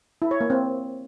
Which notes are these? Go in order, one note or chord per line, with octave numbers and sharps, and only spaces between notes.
E4
C#5
A#3
C4